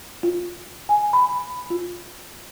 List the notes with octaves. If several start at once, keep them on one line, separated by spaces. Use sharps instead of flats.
F4
G#5
B5
F4